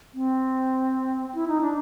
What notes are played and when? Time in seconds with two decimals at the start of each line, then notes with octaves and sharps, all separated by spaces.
0.14 C4
1.35 E4
1.48 D#4
1.61 D4